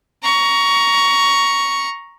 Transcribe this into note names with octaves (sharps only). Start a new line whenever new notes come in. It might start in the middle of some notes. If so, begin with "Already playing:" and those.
A#5 C#6